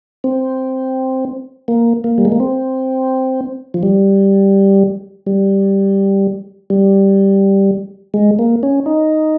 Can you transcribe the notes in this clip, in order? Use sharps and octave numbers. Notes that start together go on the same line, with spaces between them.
C4
A#3
A#3
G3
G#3
A#3
C4
F3
G3
G3
G3
G#3
A#3
C#4
D#4